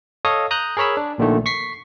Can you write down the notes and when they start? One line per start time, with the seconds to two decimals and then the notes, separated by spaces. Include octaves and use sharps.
0.25 A4 C#5 D#5 F5 D#6
0.51 A#5 D#6 F#6 G6
0.77 G#4 A#4 C#5 B5 E6
0.97 D4
1.18 A#1 A#2 D3 D#3 A3
1.46 C#6 B6 C7